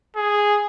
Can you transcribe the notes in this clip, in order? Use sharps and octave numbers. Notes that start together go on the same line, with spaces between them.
G#4